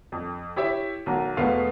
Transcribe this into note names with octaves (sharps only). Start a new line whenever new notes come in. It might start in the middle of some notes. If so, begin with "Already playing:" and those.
F2
E4 G4 C#5 E5
B1 D#3 F#4 A#5
E1 B2 A3 B3 F5 C#6